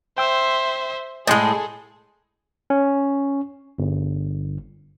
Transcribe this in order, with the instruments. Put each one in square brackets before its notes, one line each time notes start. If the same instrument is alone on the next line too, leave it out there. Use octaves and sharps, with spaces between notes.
[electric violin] C5 E5 [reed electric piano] G5 E6
[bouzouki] A2 G#3 [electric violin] G#4 A4 [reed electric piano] D#5 G#5 C6
[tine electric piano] C#4
G1